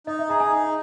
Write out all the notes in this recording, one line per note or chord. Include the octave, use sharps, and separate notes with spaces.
D#4 D#5
E5
G#4 A#5
G#5
D#4 G#5